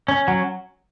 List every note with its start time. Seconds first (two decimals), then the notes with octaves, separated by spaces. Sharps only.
0.08 C#4
0.28 F#3